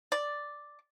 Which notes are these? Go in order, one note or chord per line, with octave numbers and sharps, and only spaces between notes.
D5